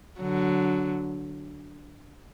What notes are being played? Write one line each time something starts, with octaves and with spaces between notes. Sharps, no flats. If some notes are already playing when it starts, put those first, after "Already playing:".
D3 F#3